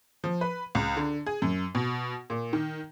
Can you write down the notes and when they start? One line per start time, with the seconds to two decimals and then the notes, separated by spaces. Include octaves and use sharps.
0.24 F3
0.41 B4
0.75 C#2
0.97 D3
1.26 G#4
1.42 F#2
1.75 B2
2.30 A#2
2.53 D#3